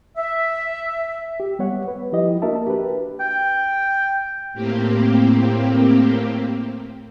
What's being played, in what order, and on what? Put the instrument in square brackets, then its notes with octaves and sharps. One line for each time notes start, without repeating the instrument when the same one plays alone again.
[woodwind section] E5
[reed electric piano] G4
G3 B3 C#5 F#5
B4
F3 E4 G4 D#5
A#3 D4 F#4 A#4 E5 A5
G4 B4
[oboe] G5
[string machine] A2 A#3 C4 G4